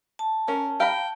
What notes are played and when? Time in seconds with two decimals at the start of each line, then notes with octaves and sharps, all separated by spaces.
0.19 A5
0.48 C#4 A#4
0.80 F5 G5 A#5 B5